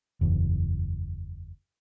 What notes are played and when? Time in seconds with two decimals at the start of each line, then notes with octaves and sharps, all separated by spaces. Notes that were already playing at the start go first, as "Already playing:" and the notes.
0.21 F#1 E2